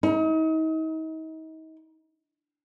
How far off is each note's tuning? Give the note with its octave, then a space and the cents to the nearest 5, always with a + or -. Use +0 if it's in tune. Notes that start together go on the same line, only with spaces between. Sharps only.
D#4 +35